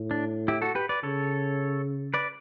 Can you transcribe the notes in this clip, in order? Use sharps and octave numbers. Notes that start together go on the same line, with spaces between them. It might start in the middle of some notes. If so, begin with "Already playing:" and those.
Already playing: A2
D4
E4 G4
F#4 A4
G4 B4
B4 D5
C#3 A4 C#5
B4 D5